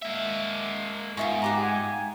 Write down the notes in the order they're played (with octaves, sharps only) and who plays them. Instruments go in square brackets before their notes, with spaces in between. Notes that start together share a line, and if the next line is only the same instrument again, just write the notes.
[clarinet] G#3 [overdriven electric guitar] A#3 E5
[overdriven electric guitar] G#2 [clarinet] B3 [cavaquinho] F4 E5 C#6
[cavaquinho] F4 G4 F#5 [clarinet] A#5
[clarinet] G#5